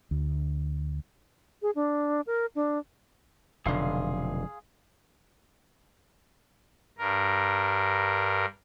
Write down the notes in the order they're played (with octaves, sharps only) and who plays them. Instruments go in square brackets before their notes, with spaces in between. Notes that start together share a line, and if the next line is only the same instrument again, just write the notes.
[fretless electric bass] D2
[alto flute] G#4
D4
A#4
D4
[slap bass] F1 [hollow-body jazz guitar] B1 D3 [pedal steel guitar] G#4 F5 C6
[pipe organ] G2 A#4